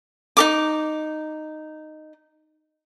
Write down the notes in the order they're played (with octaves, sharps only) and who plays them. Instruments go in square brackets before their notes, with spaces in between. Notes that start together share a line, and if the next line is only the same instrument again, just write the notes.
[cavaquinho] D#4 A#4 D6